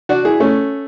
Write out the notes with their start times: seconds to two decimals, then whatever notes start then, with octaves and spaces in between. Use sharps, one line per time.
0.09 D4 F#4
0.25 E4 G#4
0.40 A3 C#4